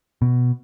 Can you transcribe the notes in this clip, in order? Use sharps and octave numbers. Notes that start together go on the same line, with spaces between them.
B2